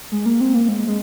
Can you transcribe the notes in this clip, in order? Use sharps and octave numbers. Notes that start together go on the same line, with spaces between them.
G#3
A#3
C4
A#3
G#3
G#3